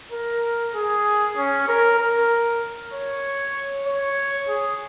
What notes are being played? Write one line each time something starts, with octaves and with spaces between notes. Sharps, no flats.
A#4
G#4
C#4
A#4
A#4
C#5
C#5
G#4